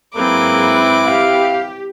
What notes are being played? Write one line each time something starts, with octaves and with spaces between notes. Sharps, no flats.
G#2 F#3 A#3 C4 E4 G#4 B4 D6
G4 F5